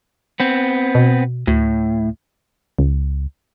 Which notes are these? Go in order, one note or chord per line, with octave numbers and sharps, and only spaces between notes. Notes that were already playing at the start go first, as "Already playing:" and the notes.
B3 C4
B2
D2 A2
C#2